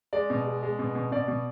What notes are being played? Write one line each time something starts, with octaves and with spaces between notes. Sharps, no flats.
G#3 D5
B2
G#3
G#3
B2
B2
B2 D5
B2